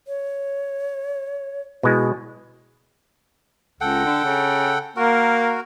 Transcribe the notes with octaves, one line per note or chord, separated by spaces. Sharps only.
C#5
B2 G#3 E4
C#2 A4 F#5 G5
D3
C#3
A#3 F#4 A#4